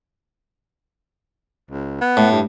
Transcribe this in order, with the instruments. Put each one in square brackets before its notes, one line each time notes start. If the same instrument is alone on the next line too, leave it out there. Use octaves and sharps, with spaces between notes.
[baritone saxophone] C#2
B3
[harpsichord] A2
[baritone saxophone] G2